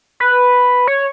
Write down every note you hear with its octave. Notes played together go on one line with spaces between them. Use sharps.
B4
C#5